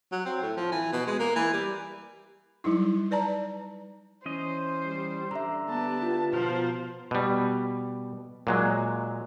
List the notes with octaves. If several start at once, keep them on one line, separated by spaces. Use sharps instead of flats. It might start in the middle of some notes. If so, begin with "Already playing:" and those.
F#3
C4
A2
F3
E3
B2
G#3
A#3
E3
G3
F#3 G3 D#4 E4
B4 D5 A5 A#5
E3 C#4 C5 D#5
G3
D3 E5 A#5
B3 G4 A5
F4 B4
B2 F3 A#4 C5
B2 G3
A#2 F#3 G#3